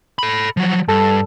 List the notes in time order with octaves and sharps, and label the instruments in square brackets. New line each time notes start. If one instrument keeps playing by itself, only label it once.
[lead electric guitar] A4 B5
F3 F#3
[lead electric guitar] G2 [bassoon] A4